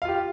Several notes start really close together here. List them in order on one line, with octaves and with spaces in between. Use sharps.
F5 F4 G4